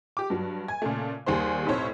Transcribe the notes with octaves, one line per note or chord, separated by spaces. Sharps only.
G4 D6
G2 F#3
G#5 G#6
A#2 C#3 A3
D#2 G3 G#4 C5 C6
F1 B1 A2 C4 C5 C#5